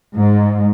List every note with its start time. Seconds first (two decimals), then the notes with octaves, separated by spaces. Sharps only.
0.16 G#2